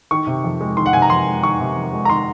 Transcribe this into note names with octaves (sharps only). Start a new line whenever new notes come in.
D#3 C#6
C3
F2
G#3
D#3 C6
F#5
C3 G#5
A#5
F2 C6
G#3
D#3 C#6
C3
F2
G#3
A#5
D#3 C6